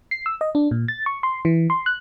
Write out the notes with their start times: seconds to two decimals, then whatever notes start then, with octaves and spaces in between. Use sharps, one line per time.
0.11 C7
0.26 E6
0.41 D#5
0.55 D4
0.71 A#2
0.88 A6
1.06 C#6
1.23 C6
1.45 E3
1.70 C6
1.86 F#6